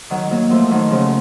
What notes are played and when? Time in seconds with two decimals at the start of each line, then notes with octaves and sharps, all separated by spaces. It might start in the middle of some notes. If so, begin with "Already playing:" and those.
0.10 D#3 F#3
0.31 F#3 A#3
0.50 F3 A3
0.71 D#3 F#3
0.91 C#3 F3